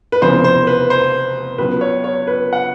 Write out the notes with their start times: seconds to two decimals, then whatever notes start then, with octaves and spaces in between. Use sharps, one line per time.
0.12 B4
0.21 F1 E2 C#3 F3 G#3 C5
0.44 C5
0.67 B4
0.90 C5
1.58 C#2 C#3 F#3 B3 B4
1.81 C#5
2.04 C#5
2.27 B4
2.53 F#5